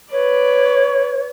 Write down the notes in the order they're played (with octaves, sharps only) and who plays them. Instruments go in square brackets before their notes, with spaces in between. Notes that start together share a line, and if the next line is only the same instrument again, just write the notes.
[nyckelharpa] B4 D5 [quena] C#5